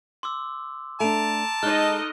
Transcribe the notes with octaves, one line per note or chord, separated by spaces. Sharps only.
C6 D6 E6
A3 D4 A5 A#5 D7 F7
G#3 D#4 A4 D#5 F6 F#6 G7